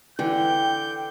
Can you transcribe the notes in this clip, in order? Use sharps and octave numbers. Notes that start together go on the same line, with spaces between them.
D3 E3 G5 G6